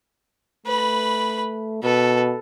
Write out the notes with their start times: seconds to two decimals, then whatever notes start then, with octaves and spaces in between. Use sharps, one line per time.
0.66 A3 B4 B5
1.83 B2 A4 B4